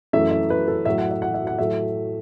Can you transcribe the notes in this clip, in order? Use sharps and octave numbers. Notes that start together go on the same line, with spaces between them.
F#2 E3 A3 E5
E5
B4
A4
A2 F#3 A3 E5
F#5
E5
F#5
E5
F#5
A2 F#3 A3 E5